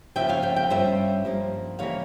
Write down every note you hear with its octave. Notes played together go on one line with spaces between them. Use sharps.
C#3 F3 A#3 F4 E5 G5
C#5 F5
E5 G5
E5 G5
G2 G3 C#4 F4 C5 E5
G2 F3 A#3
C#3 E3 G3 A#3 E4 C#5 F5